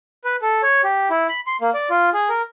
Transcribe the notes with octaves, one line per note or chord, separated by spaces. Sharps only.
B4
A4
C#5
G4
E4
B5
C6
A#3
D5
F4
G#4
A#4